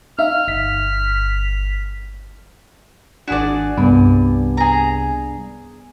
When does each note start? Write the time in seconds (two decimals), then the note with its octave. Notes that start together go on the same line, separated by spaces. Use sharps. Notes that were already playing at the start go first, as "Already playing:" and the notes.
0.19 D#4 E5 F5 F6
0.48 G1 B6
3.28 G#1 D4 F#4 G#4 D5
3.77 C2 G2 C3 B3 G#5
4.57 G#4 A#5